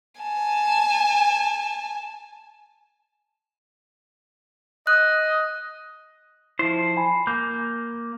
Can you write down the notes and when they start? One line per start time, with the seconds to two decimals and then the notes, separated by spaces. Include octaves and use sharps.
0.21 G#5 A5
4.87 D#5 F#6
6.59 F3 E4 C5
6.97 G#5 B5
7.27 A#3 G6